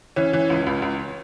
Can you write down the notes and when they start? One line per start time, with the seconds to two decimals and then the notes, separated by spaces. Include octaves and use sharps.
0.16 E3 C#4
0.33 E3
0.50 C#2
0.67 C#2
0.82 C#2